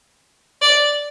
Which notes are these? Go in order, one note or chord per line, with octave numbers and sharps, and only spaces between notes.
D5